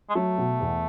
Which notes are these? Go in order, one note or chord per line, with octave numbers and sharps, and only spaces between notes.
G#3
F#3 A3
B2
E2